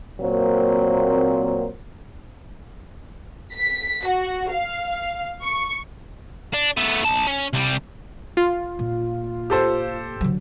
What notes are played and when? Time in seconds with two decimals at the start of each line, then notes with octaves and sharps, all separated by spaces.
0.21 A#2 F#3 A#3 C4
3.54 B6
4.07 F#4
4.51 F5
5.43 C#6
6.54 D4
6.77 A3 B3
7.03 B1 A5
7.27 C#4
7.53 C3 G3
8.37 F4
8.79 A#2
9.50 G4 A4 C5
10.21 D3 F#3